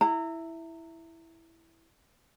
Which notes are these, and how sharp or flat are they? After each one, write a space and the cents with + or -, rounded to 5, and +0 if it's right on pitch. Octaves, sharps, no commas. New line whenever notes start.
E4 +0 A#5 -30